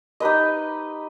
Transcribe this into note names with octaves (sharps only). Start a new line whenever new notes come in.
D#4 G4 B4 D#5